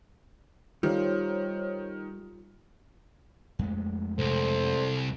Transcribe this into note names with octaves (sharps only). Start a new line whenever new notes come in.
D#3 G3 F4 G4 A4 C5 C#5
F2 G#3 A3
C2 A4 C5